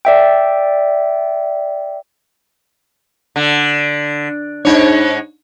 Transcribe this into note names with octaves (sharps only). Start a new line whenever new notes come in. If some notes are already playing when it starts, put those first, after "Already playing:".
D5 E5 G5
D3
G#2 D4 D#4 C#5